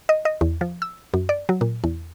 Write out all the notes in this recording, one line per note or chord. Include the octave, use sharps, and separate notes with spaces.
D#5
D#5
E2
F3
E6
F#2
D5
F#3
A#2
E2